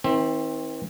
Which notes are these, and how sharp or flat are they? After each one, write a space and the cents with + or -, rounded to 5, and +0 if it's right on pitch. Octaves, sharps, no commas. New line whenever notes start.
E3 -45 C4 +20